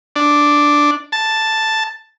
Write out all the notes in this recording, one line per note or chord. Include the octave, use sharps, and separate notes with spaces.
D4
A5